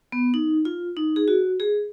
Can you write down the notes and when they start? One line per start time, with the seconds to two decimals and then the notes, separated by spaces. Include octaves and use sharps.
0.12 B3
0.34 D#4
0.65 F4
0.97 D#4
1.16 G#4
1.28 F#4
1.60 G#4